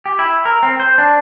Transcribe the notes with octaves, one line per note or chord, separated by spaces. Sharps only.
G4
E4
A#4
C4
C5
D4